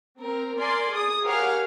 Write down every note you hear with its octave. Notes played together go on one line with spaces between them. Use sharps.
C4 A#4
A#4 D5 G#5 C6
G#4 D#6
G4 A#4 C#5 F5 F#5 G#5